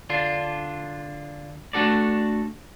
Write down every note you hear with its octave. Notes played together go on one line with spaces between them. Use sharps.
D3 D4 F4
A3 D4 F#4 A4 D5